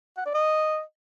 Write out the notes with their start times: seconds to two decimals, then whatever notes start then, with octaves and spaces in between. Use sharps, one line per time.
0.17 F#5
0.26 D5
0.34 D#5